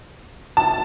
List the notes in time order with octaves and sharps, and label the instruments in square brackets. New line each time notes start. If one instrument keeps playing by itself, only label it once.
[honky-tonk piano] A5